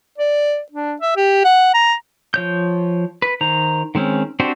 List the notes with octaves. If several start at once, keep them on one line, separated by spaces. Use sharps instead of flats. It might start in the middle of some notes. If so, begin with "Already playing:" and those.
D5
D4
E5
G4
F#5
A#5
F3 C#5 G6
B4
D#3 C5 A#5
D#3 G#3 C4 C#4
C4 D4 F#4 G4 C5